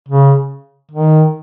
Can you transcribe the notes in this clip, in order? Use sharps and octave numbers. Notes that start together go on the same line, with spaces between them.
C#3
D#3